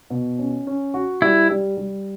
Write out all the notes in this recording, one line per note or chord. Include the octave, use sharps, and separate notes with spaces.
B2
C#4
C#4
F#4
G3 E4
G3
G3